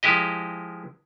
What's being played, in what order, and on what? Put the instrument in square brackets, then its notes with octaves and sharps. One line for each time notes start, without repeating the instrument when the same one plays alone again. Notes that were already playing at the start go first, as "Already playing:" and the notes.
[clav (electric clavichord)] F3 G#3 E4 G4 D#5